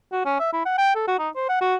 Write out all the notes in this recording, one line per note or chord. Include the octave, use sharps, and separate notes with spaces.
F#4
C#4
E5
E4
F#5
G5
A4
F#4
D#4
C5
F#5
F#4